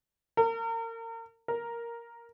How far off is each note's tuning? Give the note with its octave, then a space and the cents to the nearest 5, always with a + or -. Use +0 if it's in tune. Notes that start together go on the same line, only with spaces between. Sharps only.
A#4 -30
A#4 +5